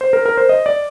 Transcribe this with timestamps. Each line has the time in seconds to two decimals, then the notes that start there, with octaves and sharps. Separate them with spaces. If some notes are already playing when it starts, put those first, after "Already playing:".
0.01 C5
0.13 A#4
0.26 A#4
0.37 C5
0.49 D#5
0.66 D5